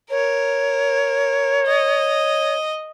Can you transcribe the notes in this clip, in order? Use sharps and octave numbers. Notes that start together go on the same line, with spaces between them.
A#4 C#5
D#5